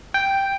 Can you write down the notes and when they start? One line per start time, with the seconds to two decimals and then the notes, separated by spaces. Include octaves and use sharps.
0.14 G5